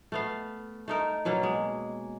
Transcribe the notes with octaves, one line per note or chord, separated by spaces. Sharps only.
A3 B3 F5
A3 D#4 A#4
B2 F#3 A#3 C#4
G#3